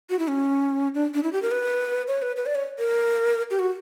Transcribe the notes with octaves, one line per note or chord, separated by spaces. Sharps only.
F#4
E4
C#4
D4
D4
E4
G4
A#4
B4
C#5
B4
B4
D5
C#5
A#4
G4
F#4